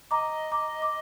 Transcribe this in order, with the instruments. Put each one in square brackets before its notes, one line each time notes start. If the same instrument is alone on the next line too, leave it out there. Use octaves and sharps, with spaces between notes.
[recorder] D#5 [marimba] A#5 D6
[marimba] A#5 D6
D6